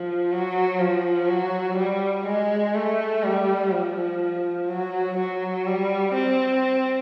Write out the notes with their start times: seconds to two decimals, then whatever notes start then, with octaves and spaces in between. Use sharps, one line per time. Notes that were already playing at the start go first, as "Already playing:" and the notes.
Already playing: F3
0.32 F#3
0.79 F3
1.28 F#3
1.77 G3
2.26 G#3
2.75 A3
3.23 G3
3.72 F3
4.68 F#3
5.18 F#3
5.67 G3
6.14 C4